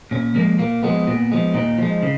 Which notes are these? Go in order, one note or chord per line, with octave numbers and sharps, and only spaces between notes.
A#2 C#4
F3 G#3 A#3
A#2 A#3
F3 G#3 B3
A#2
F3 G#3
A#2 D#4
F3 G#3
C#3